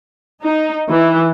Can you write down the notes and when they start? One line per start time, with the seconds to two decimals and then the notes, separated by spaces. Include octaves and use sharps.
0.43 D#4
0.90 E3